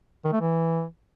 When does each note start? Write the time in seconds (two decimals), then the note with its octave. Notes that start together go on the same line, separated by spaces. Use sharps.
0.24 D#3
0.32 A3
0.41 E3